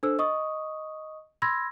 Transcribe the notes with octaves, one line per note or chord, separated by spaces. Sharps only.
D4 A4 C5 E6
D#5 C#6 D#6
B5 C6 E6 G#6 A#6